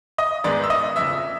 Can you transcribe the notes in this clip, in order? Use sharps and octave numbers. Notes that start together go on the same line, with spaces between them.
D#5 D#6
G#2 D#3 G#3 B3 D5 D6
E6
D#5 D#6
F#1 F2 C#3 E5 E6